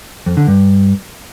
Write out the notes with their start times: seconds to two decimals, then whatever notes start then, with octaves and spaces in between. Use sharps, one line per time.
0.26 F2
0.37 D3
0.48 G2